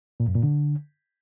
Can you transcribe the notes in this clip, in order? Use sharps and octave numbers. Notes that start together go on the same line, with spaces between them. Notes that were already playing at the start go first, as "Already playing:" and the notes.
A#2
F#2
A#2
D3